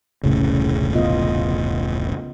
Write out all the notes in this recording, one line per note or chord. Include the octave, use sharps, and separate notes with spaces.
E1 C2 A2 C#3
B3 F4 D#5